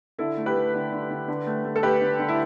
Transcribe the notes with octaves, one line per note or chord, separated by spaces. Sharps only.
D3 E4 A4
A3
G4 B4
A3
D3
D3
D3
D3
A3
A3
A4
A3 G4 B4
D3
D3
E4